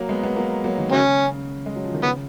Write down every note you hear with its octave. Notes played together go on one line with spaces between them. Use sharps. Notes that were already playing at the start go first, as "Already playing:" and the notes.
Already playing: F#3 A#3
G#3 B3
G#3 B3
F#3 A#3
F#3 A#3
D#3
C#3 F#3 C#4
G#3
F#3
F3
D#3
C#3 B3